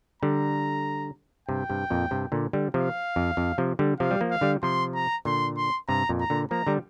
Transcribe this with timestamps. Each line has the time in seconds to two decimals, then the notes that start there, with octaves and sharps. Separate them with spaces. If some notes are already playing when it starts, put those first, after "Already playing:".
0.23 D3 G3 A#5
1.48 G2 C3 G5
1.70 G2 C3
1.90 F2 A#2
2.11 G2 C3
2.32 A#2 D3
2.53 D3 G3
2.74 C3 F3 F5
3.16 F2
3.37 F2
3.58 C3 F3
3.79 D3 G3
3.99 C3 F3 F5
4.11 G3
4.21 F3 A#3
4.31 F5
4.41 D3 G3
4.63 C3 F3 C6
4.94 A#5
5.25 A#2 D3 C6
5.57 C6
5.88 G2 C3 A#5
6.09 F2 A#2
6.20 A#5
6.30 A#2 D3
6.51 F3 A#3 A#5
6.67 D3 G3